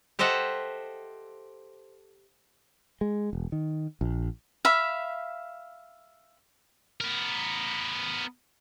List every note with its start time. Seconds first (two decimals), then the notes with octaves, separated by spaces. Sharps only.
0.19 G4 A4 C5 D#5 E5 F#5
3.01 G#3
3.33 E1
3.52 D#3
4.01 A#1
4.65 E5 F5 B5
7.01 B3 A#4